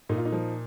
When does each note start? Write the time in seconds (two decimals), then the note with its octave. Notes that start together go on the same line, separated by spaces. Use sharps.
0.09 A#2 D#4
0.18 F4
0.25 D#4
0.32 F3